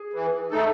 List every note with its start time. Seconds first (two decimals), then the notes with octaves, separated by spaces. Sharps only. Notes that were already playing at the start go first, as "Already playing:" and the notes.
Already playing: G#4
0.13 E3
0.51 A3 D#4 A4